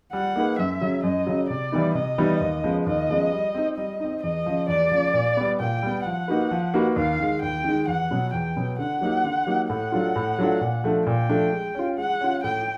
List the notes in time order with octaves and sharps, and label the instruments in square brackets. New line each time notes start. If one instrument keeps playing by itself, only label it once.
[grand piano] G3 [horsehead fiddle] F#5
[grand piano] A#3 D#4 G#4 B4
[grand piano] F#2 [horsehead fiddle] E5
[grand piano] C#3 F#3
[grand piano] F#2 [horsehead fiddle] D#5
[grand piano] C#3 F#3
[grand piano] C3 [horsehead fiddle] D5
[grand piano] E3 G3 B3 D#4
[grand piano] C3 [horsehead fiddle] D#5
[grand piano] E3 G3 B3 D#4
D#2
C#3 F3 G#3 B3
[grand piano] D#2 [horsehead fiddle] D#5
[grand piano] C#3 F3 G#3 B3
G3
C4 D#4
[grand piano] G3 [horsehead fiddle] D#5
[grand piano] C4 D#4
[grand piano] E2 [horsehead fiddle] D#5
[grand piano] C#3 F3
[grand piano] E2 [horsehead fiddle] D5
[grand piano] C#3 F3
A#2
G3 B3
[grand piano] A#2 [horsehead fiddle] G5
[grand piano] G3 B3
[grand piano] F3 [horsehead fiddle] F#5
[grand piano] A#3 D#4 F#4 B4
F3
A#3 D#4 F#4 B4
[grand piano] D#2 [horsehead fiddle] F5
[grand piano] D#3 G#3
[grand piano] D#2 [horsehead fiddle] G5
[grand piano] D#3 G#3
[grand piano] E2 [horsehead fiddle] F#5
[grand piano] B2 F#3 B3
[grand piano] E2 [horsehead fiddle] G5
[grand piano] B2 F#3 B3
[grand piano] D3 [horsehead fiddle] F#5
[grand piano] F#3 A#3 D#4 G4
D3
F#3 A#3 D#4 G4
[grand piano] A2 [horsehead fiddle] F#5
[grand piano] F#3 A3 D4 F4
A2
F#3 A3 D4 F4
A#2
F3 A3 D4
[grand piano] A#2 [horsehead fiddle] G5
[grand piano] F3 A3 D4
G#3
C#4 F4
[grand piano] G#3 [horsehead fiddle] F#5
[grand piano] C#4 F4
[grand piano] A2 [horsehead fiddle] G5